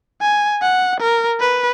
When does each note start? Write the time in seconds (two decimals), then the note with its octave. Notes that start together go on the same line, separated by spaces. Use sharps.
0.22 G#5
0.62 F#5
1.00 A#4
1.40 B4